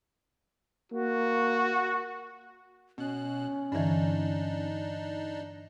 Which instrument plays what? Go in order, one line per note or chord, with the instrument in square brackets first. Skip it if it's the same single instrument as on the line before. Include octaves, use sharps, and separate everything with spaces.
[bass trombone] A#3 [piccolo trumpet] F#4
[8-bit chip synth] B2 F#6 [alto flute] C#4
[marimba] G2 D3 E3 [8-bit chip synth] D4 D#4